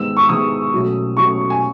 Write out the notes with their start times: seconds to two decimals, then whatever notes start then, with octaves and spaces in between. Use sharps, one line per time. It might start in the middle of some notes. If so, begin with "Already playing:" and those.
Already playing: G#2 D#3 G#3 B3 E6
0.17 C#6
0.29 G#2 D#3 G#3 B3 D#6
0.73 B1 B2 A3 C#4
1.17 B1 B2 A3 C#4 C#6
1.50 G#5